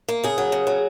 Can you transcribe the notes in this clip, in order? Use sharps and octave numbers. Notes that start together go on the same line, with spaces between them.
A#3
C#3 G#4
F#3
C#3
F#3